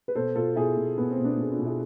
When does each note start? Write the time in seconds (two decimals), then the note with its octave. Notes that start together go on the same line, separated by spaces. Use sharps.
0.08 B4
0.15 B2 A4 C5
0.35 B2 F4 A4
0.56 B2 E4 G#4
0.77 B2
0.98 B2 B3
1.10 C4
1.18 B2
1.24 B3 D4
1.37 B2 G#4
1.51 D4 F4
1.59 B2
1.66 E4 G#4